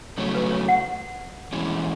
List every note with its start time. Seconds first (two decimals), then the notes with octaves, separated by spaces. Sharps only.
0.18 C#3 F#3 A3 C#5
0.35 B4
0.51 C#5
0.68 F#5
1.53 E3 G#3 C#4